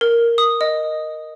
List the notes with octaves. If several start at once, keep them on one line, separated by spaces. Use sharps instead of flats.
A#4
D#6
D#5